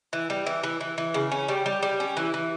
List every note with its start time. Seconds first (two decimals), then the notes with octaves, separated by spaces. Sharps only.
0.13 E3
0.30 G3
0.46 E3
0.63 E3
0.81 E3
0.98 E3
1.14 C#3
1.32 C#4
1.48 G3
1.66 G3
1.83 G3
2.00 C#4
2.17 E3
2.34 E3